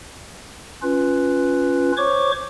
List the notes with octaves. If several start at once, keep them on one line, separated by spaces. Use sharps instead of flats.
C#4 F4 B4
C5 C#5 C#6 D6